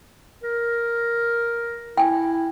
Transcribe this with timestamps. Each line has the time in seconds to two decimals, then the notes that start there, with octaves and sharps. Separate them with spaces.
0.44 A#4
1.97 E4 G5 G#5